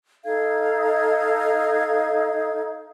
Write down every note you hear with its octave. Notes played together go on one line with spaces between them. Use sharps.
D#4 A4 F5 G#6